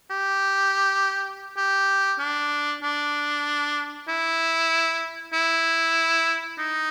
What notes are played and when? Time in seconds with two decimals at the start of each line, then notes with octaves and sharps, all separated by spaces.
0.10 G4
1.57 G4
2.19 D4
2.83 D4
4.08 E4
5.33 E4
6.58 D#4